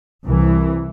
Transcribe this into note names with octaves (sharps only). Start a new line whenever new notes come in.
C2 E3